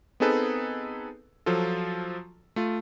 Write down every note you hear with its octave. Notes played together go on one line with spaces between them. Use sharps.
B3 C4 D#4 G#4 A4 B4
F3 F#3 F4 A4
A3 F4